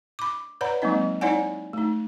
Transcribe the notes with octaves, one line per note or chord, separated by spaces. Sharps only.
B5 D6
B4 C#5 D5 F#5 A#5 B5
F#3 G#3 A#3 C4 D#4 D#5
D#4 E4 C#5 D5 F#5 G#5
A3 D#4